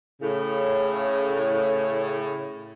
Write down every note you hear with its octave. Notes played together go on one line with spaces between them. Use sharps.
A2 C#3